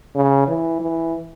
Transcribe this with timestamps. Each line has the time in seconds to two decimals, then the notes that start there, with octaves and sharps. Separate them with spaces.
0.15 C#3
0.48 E3
0.80 E3